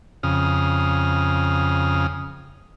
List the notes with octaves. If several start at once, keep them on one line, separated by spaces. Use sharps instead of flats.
F2 C#3 D#6 F6